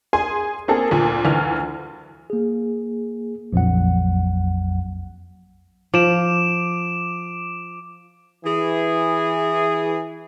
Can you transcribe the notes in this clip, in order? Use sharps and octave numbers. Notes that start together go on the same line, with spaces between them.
G#4 G#5 C6
A#3 C4 G#4 A4
D2 A#2
D2 E3 F4 F6
A#3 G#4
A#1 F2 F#3 F#5
F3 D6 D7 E7
E3 G#4